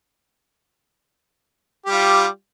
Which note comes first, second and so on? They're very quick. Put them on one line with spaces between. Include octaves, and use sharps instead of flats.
G4 G3 F4